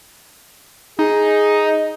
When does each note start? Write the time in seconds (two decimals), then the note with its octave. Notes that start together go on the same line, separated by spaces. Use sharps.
0.99 D#4 G#4